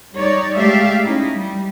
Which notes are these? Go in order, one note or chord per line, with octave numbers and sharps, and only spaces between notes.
G3 D#4 C#5 D5
G#3 A3 G4 D5 E5 F5
C#4 D#4 E4
G3